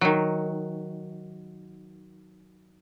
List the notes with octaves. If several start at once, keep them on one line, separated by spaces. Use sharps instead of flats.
D#3 F#3